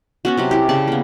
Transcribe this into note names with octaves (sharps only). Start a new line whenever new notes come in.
B3 C#4 F#4
C3 F#3 C#4
E4 G4
C#3 D5 A5
A#3 B3